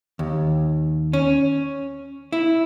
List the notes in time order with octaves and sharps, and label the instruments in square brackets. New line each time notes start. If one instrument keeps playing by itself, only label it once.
[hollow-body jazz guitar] D#2
C#4
E4